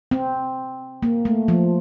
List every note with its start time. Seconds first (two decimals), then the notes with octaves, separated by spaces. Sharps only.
0.11 C4
1.03 A#3
1.25 A3
1.48 F3